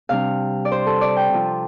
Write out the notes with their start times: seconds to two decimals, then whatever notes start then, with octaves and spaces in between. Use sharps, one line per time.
0.09 C3 G3 D4 F5
0.65 D5
0.72 C5
0.86 A4
1.01 D5
1.17 G5
1.33 C3 F3 C4 F4